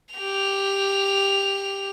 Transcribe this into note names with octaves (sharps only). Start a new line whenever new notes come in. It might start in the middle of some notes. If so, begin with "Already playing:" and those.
G4 F7